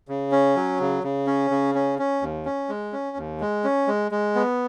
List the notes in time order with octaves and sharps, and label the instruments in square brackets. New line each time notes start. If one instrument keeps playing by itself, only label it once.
[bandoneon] C#3
C#4
F#3
C#3
C#3
C#4
C#3
C#4
C#4
D#2
C#4
G#3
C#4
D#2
G#3
C#4
G#3
G#3
B3